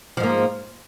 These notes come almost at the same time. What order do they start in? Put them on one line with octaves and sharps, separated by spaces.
F3 G#2 A#3